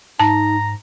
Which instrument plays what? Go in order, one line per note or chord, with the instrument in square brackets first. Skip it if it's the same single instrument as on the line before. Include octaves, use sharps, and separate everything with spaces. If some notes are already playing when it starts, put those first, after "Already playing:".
[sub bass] G#2 [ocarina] D#4 [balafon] A5 [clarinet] A#5